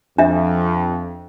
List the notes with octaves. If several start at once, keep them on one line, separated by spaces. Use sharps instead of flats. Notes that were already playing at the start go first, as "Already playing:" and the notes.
F2 D4 E5